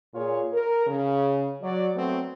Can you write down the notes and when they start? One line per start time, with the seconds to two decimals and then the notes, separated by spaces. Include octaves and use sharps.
0.14 A#2 F4 G#4 C#5
0.53 A#4
0.87 C#3
1.62 F#3 D5
1.95 F#3 A3 B3 C4